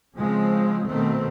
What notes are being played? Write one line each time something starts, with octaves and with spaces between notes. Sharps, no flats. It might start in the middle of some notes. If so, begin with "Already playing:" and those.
C#3 F3 G#3 C4
B2 D#3 A3 C4